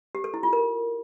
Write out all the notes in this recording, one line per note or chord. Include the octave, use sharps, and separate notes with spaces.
G4
A4
E4
F4
A#4